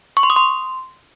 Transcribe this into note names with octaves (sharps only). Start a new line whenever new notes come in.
C#6
C6
D#6
C6